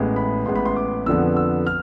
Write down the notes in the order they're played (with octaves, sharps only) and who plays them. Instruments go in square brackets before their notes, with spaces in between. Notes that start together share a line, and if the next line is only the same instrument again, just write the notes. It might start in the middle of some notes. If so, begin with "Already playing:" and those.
Already playing: [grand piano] A1 A2 G#3 B3
B5
A1 A2 G#3 B3 C6
B5
C6
D6
F2 D3 F3 B3 E6
E6
F6